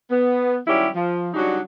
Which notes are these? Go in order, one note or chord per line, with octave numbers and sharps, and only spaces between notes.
B3
D#3 F#3 G3 C#4 E4 G4
F3
C#3 F#3 G3 D4 D#4 F#4